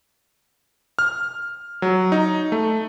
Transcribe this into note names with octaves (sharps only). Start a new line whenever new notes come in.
F6
F#3
D#4
A3